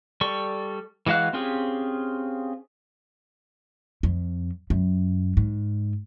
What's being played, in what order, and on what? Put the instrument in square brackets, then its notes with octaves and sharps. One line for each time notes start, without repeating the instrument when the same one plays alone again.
[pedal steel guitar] G3 A4 C#6
E3 G#3 F#4 F5 F#6
C4 C#4 F4 G4 G#4
[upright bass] F2
F#2
G#2